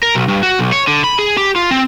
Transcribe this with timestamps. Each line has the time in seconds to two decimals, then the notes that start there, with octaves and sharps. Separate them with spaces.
0.03 A#4
0.15 B1
0.28 G2
0.43 F#4
0.59 B1
0.72 C#5
0.87 D3
1.04 B5
1.19 G#4
1.38 G4
1.56 F4
1.71 C4